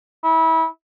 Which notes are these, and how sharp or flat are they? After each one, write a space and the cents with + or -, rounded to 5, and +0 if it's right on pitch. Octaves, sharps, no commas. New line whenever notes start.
E4 -25